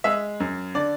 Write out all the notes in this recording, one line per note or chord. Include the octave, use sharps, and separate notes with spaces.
G#3 E5
F#2
D3 D5